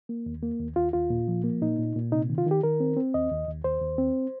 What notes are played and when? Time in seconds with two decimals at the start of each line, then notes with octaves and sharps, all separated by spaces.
0.09 A#3
0.26 D#2
0.43 A#3
0.60 D#2
0.76 D#2 F4
0.93 D#2 F4
1.10 A#2
1.28 F3
1.44 A#3
1.61 A#2 D#4
1.79 A#2
1.96 A#2
2.12 C3 D#4
2.30 D#3
2.38 F4
2.46 D#3 G4
2.63 D#3 A#4
2.80 C4
2.97 C4
3.14 D#2 D#5
3.31 D#2
3.48 D#2
3.64 D#2 C5
3.82 D#2
3.98 C4